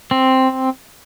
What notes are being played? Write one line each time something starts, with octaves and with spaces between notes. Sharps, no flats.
C4